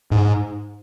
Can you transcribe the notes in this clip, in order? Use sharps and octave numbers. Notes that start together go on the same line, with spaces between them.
G#2